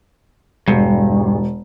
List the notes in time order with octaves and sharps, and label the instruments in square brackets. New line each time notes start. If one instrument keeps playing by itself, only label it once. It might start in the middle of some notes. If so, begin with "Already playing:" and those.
[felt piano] E1 [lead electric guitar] G2